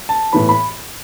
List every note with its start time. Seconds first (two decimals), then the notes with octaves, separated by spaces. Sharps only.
0.09 A5
0.33 A2 E3 B3 B5
0.49 B5